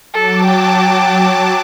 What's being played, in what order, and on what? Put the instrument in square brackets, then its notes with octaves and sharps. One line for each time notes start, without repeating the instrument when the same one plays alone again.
[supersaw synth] F#3 A5 D6 [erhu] A4
[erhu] G5